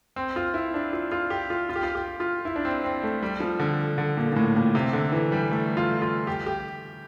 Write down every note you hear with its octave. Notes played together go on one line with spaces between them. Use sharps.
C4
F4
E4
D4
F4
F4
G4
F4
F4
G4
F4
G4
F4
E4
D4
C4
C4
A3
G3
F3
D3
D3
A#2
A#2
A2
A#2
C3
D3
E3
G3
A3
F4
F4
G4
G4